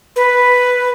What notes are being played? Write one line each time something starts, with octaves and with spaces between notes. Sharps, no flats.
B4